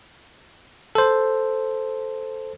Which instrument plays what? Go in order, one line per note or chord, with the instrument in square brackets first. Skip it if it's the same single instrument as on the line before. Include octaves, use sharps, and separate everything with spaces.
[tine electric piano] A4 C5